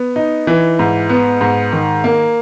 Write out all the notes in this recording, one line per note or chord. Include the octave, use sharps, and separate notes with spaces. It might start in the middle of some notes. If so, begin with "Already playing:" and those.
Already playing: B3
D#4
E3
G#2
B3
G#2
D#3
A#3